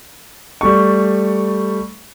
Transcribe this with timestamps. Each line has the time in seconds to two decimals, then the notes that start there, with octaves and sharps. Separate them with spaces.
0.61 G3 A3 C#6